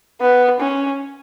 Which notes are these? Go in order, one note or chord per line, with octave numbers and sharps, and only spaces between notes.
B3
C#4